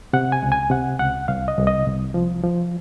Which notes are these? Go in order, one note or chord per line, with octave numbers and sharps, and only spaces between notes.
C3 F#5
G#5
C#2
G#5
C3 F#5
C#2 F#5
C2 F5
D#5
C2
D#5
C2
F3
F3